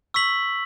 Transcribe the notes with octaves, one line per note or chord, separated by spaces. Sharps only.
C#6 E6 B6 F#7